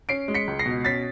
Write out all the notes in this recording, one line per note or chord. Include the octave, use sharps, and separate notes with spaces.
C#4 C7 D7
G#3
B6 C#7
C#2
A#6 C7
B2
C#4 A6 B6